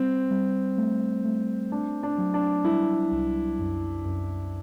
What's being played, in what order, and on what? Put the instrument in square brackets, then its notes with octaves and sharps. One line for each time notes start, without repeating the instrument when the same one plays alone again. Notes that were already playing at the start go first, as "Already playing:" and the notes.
Already playing: [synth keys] G3 [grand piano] C4
[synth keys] G3
A3
A3
[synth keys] A3 [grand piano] D4
[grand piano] D4
[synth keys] F#3
[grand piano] D4
[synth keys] G3 [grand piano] E4
[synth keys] C2
F#2
F#2